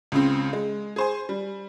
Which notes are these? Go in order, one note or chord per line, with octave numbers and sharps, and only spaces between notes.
C#2 C#3 C4
G#3
G#4 C5 G#5
G3